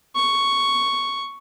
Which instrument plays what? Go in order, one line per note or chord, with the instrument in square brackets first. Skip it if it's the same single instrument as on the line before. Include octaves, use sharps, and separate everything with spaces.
[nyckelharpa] C#6